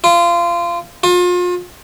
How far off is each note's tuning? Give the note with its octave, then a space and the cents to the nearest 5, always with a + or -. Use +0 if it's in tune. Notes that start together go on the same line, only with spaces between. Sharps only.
F4 -25
F4 +35